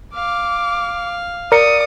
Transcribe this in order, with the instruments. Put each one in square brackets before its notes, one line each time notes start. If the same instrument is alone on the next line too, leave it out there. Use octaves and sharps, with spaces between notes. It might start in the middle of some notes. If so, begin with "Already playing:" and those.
[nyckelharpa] F5 [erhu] D6
[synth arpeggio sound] A#4 [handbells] D5 C#7 [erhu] D#6